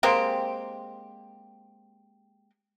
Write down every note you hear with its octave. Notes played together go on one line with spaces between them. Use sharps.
G#3 A#3 C4 G4